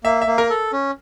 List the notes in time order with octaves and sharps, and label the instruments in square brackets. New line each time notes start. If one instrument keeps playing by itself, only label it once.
[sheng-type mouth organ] A#3 [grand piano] E5
[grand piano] E5
[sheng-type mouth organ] A#3
[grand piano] A#4
[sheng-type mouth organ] A4
C#4